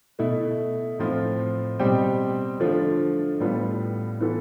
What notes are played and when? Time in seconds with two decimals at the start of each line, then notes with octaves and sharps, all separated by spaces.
0.19 B2 A3 E4
0.99 A2 F3 C4 F4
1.79 B2 G3 C4 G4
2.60 D3 F3 A3 D4 F4
3.40 A2 G3 B3 F4 A4
4.21 E3 B3 F4 A4